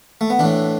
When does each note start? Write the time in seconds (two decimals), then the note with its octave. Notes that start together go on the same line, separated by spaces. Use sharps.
0.21 A3
0.30 B3
0.39 A2 E3 D4